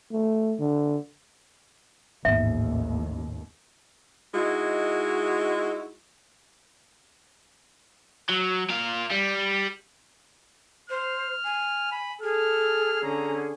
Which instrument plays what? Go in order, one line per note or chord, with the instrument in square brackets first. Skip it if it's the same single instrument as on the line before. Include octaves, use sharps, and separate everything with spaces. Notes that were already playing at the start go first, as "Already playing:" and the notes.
[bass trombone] A3
D3
[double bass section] A1 D#2 [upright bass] G#2 B3 [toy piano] E5
[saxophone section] G#3 D#4 E4 F#4
[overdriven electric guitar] F#3
A#2 F5
G3
[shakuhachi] C5 [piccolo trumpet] F6
[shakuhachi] G#5
[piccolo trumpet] B5
[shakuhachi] G#4 [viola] A4 [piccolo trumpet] F6
[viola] D3 C#4 [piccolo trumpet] A#5